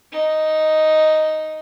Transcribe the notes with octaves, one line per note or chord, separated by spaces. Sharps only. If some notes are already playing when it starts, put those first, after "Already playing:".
D#4